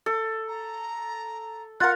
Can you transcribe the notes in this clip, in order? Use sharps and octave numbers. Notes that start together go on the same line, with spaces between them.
A4
A#5
F4 A#4 F#5 F#6 A6